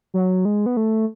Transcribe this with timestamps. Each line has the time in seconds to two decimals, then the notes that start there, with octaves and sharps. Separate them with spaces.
0.14 F#3
0.45 G#3
0.66 B3
0.77 A3